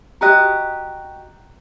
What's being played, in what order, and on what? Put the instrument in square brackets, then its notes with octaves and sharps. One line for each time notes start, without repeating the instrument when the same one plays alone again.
[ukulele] F#4 G4 D#5 [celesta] A#5 F#6